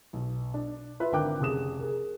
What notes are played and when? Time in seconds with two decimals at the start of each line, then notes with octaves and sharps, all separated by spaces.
0.13 B1
0.54 D4
1.00 F4 B4 E5
1.12 G#1 D3 A#4 G5 D6 F#6
1.40 F1 C#3 G#4 D#6 E7
1.79 G#4 A#4